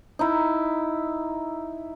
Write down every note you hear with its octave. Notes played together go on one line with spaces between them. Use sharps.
D#4 E4